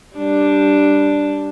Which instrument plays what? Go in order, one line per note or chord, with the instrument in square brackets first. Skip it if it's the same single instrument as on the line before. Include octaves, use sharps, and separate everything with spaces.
[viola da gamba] G3 D4